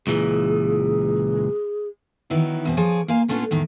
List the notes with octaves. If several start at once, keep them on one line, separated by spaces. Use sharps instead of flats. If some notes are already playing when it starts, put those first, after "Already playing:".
C#2 A#2 E3 G#4
D#3 E3 F#3 B3 D#4 E4
E2 B2 C4
F3 G#4 C#5 D5
A#3 F4 F5 G#5
A#2 A3 B3 C#4 D4 F4
E2 A2 D#3